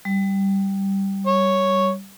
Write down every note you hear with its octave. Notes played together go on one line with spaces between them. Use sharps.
G3
C#5